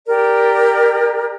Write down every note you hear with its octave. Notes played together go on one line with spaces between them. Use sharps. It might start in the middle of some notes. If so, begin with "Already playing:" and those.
G4 A#4 D5